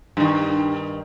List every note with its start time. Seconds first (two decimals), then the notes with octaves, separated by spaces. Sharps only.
0.17 G2 D#3